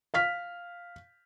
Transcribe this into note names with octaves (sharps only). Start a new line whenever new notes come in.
F5 F6 B6